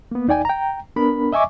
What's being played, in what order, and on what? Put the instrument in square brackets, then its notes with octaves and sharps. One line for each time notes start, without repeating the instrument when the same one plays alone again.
[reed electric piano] A#3 B3
D#2 D#4 D5 G5 G#5
G5 A#5
B3 D4 A#4 B5
D#5 E5 G#5 C#6 D6